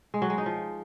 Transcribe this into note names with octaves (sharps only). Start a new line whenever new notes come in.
G#3
F#3
G#3
D#4
F3